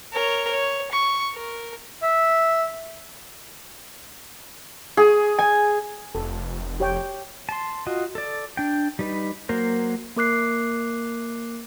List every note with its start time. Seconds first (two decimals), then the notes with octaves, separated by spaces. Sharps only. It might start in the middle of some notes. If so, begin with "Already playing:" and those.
0.13 A#4 C#5
0.51 C#5
0.92 C#6
1.34 A#4
2.02 E5
4.97 G#4
5.39 G#5
6.15 F1 A4
6.80 G4 C#5 G5
7.49 A5 C6
7.87 F4 F#4 D#5
8.15 A4 D5
8.57 D4 G5
8.99 G3 D#4 B4
9.49 F#3 A#3 A#4 C5
10.16 A#3 A#4 D6 F#6 C7